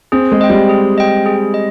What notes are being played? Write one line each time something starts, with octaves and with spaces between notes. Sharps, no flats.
C4 G#4
G#3
D#5 G5
G3
G#4
D#5 G5
G#4
D#5